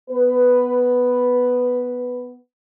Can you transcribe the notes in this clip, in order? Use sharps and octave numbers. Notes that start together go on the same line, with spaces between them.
B3 B4